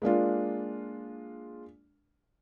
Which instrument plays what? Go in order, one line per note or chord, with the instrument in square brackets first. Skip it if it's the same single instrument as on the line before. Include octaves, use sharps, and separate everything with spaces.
[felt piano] G#3 A#3 D4 F4